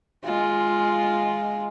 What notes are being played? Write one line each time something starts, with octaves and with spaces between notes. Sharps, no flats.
G#3 F4